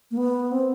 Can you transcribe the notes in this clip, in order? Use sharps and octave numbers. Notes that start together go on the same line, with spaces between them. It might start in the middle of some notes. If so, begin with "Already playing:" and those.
A#3
B3
C4